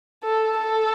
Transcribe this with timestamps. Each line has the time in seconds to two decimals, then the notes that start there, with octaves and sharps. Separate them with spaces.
0.24 A4
0.57 A4